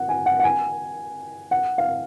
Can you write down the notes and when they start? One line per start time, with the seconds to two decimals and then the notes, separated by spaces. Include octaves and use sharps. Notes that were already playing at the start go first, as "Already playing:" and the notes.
Already playing: F#5
0.09 G#5
0.26 F#5
0.39 F#5
0.44 G#5
1.51 F#5
1.78 F5